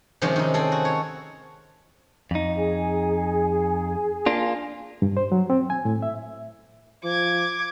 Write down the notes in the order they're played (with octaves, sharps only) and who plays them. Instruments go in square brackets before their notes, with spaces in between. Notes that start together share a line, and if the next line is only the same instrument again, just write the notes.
[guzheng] C3 D#3 F3 G#3 C4 C#4
D#3 D#4
C4 G#4 A4
F#4
C#5
[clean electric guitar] F2 D#4
[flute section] G#4 G#5
[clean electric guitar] A#3 D4 F4
[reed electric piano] G2
C5
F#3
C4
G#5
A2
E5
[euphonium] F3 [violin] D6 G#6